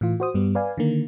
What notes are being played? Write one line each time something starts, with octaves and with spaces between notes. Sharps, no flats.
A2 E3 F4
F#4 C5 D#6
G2 G3 B3
B4 D5 F5 G#5
D3 D#3 A#3